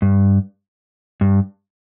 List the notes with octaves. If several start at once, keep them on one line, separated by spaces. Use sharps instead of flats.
G2
G2